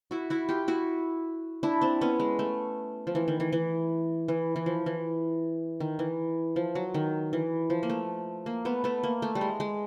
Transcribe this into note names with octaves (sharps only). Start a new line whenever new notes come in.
E4 F#4
E4 F#4
F4 G4
E4 F#4
D4 E4
C4 D4
B3 C#4
G#3
A3
F3
E3
D#3
E3
E3
E3
E3
F3
E3
D#3
E3
F3
F#3
D#3
E3
F3
A#3
A3
A#3
A3 B3
A3 B3
A#3
A3
G3
G#3
G#3